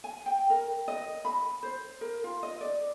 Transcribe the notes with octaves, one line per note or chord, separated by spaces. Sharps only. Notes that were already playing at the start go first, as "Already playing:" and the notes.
G#5
G5
A#4
D#5
B5
C5
A#4
F4
D#5
D5